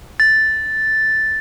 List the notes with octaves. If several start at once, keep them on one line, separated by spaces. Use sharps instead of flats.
A6